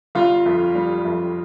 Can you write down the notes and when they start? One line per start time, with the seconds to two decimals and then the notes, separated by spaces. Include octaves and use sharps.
0.15 G1 F4 F5
0.46 F2
0.75 G3
1.05 F2